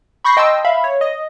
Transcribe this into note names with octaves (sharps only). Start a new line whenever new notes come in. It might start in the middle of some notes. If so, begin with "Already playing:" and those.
B5 C#6 G6 A#6 C7
D#5 G5 A5 C6 E6
E5 F5 B5
C#5
D#5